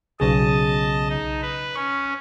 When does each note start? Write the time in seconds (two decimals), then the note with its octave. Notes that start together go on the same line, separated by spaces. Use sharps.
0.20 B1 C#3 G#4 D#5 A5
1.10 D#4
1.42 B4
1.76 C#4 C#6